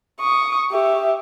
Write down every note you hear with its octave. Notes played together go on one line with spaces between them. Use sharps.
C#6 D#6
G4 E5